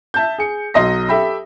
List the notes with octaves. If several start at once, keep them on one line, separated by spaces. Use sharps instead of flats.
E5 A5 G6
G#4 C#7
B1 F#3 D#5 C6 A#6
G4 A4 E5 G5 B5